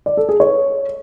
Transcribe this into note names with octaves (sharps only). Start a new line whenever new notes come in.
D5
A4
G#4
C#5